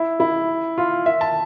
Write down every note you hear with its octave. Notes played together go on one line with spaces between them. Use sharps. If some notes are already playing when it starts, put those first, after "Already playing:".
Already playing: E4
E4
F4
E5
A5